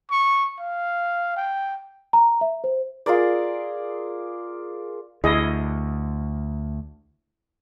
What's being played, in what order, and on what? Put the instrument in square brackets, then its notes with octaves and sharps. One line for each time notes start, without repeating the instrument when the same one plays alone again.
[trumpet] C#6
F5
G5
[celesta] A#5
E5
C5
[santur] F4 G#4 A#4 D5
[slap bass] D2 [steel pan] E4 G#4 D#5